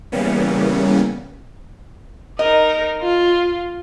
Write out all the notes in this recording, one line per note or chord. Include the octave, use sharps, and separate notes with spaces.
C#3 E3 G3 A#3 B3 C#4
D#4 A#4 D#5
F4